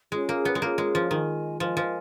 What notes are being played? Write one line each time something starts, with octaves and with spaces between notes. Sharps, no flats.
G#3 C#4 F4 G#4 C#5
A#3
B3
G#3
A#3 C#4 F4 G#4 C#5
G#3
F3
D#3 F4 A#4 D#5 G#5
F3 F4 A#4 D#5 G#5
F3